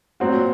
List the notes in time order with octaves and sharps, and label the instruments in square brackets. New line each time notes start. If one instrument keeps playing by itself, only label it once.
[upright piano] A#2 F#3 C4 F#4